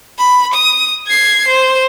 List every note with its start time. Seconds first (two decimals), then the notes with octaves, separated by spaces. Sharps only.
0.18 B5
0.54 D#6
1.07 G#6 C7
1.48 C5